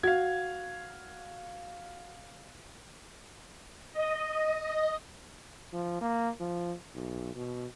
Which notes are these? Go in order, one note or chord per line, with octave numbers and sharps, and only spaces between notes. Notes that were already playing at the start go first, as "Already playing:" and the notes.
F#4 F5 G#6
D#5
F3
A#3
F3
B1
B2